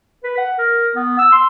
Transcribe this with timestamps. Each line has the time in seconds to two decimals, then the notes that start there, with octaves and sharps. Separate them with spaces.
0.24 B4
0.38 F#5
0.58 A#4
0.95 B3
1.19 E6
1.32 C6